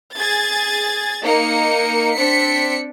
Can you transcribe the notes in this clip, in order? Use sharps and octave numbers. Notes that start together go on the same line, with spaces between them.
G#4 G#6 A6
A#3 D#4 A#4 C#7
C4 D4 B6 C#7